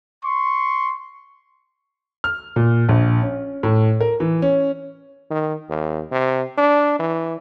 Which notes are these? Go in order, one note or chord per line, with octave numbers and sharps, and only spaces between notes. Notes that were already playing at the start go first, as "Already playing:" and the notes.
C6 C#6
F6
A#2
A#1
C#4
A2
A#4
E3
C#4
D#3
D#2
C3
D4
E3